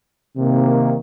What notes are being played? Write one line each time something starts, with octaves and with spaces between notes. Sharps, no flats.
C3 D#3 A#3